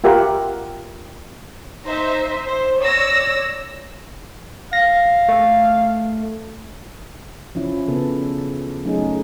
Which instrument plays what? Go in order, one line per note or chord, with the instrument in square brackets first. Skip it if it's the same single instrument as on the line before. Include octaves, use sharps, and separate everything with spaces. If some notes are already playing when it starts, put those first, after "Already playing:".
[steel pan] F4 G4 A#4 E5 F#5
[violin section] D#4 C5 E5
C5
C#5 D5 E6 A#6
[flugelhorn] F5 [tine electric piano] A#6
[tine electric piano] A3 A4
[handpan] F3 C#4 E4
C#3 B3 A4
F#3 A3 C#4 D#4 G#4